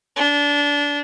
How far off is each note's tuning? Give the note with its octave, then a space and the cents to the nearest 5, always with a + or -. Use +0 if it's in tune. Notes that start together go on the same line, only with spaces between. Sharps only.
D4 -25